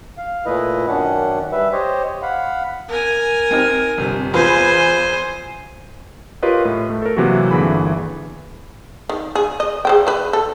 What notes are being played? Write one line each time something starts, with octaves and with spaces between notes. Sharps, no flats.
F5
A#2 A3 E4 B4 D#5
F#2 D#3 C#4 D4 F#5
G3 B4 E5
G4 C5 C#5 D#5
F5 F#5 B5
A#4 G#5
C4 D#4 F6
G1 C3
E2 F4 B4 C5 G#5
F4 G4 A#4 B4 C#5 D#5
A2
A3
A4 A#4
C3 E3 F#3 A#3 F#4
G1 D3 E3 A#3 G#4 B5
D#3
G#4
D#5
G#4 C5 G5
E3 B4
A4